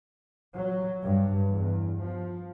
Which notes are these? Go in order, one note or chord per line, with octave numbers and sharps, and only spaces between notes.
F#3
G2
E2
F3